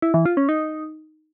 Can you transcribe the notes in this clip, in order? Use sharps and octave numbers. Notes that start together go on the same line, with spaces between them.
E4
E3
F4
C#4
D#4